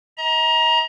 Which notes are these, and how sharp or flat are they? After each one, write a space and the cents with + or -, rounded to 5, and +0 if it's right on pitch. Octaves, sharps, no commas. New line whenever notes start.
D#5 +35 A#5 +20